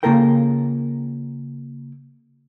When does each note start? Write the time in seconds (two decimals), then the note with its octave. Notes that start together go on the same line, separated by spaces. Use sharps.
0.03 C#3 A#3 F4 A4 A#4 G5